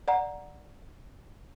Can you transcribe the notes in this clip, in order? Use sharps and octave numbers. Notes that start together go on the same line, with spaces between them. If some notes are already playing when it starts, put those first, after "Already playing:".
D5 F#5 A#5